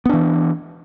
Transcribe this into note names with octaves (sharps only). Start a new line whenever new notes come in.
E3 B3 D4